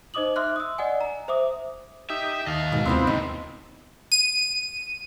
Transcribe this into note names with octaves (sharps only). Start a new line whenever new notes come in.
D#4 C5 D#5 D6 D#6 F#7
E5 C6 D6 F6 F#6
D#6 E6
D5 D#5 F#5 G#5
A#5
C5 E5 D6 D#6
D#4 G4 E5
D#2 D#5 F5 A5
G#2 B2
D#2 C3 B3 C4 E4 F4 E5
C#2 A2 D#4
D#7